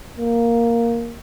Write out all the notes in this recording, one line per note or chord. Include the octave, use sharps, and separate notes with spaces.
A#3